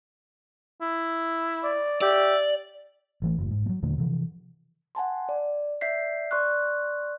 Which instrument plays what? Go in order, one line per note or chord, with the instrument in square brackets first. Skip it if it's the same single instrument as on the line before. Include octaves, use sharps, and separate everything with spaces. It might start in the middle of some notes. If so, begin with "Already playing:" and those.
[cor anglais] E4
[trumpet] D5
[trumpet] G4 [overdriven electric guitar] D5 [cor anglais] E5
[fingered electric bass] A1 E3 A3
F#1 A2
G#2
F#3 A3
D#2 A#2 D3 A3
C3 E3 F3
[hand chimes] F#5 G#5 A5 C6
D5
D5 E5 G6 B6 C7
D5 C6 C#6 F6 F#6